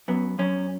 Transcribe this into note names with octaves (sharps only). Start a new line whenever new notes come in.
F#2 B3
F#2 C#4